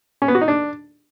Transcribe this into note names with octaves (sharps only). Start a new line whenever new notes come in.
C#4
B3
F#4
D#4
D4